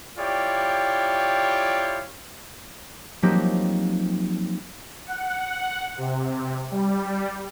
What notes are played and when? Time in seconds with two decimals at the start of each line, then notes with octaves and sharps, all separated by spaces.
0.19 E4 F4 G4 C#5 D5 G5
3.22 F3 F#3 A#3 C4 D#4 G4
5.06 F#5
5.97 C3
6.71 G3